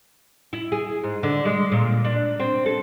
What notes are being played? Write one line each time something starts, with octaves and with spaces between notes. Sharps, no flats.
E4
G#4
G#2
D3
G#3
A#2
D4
C4
A4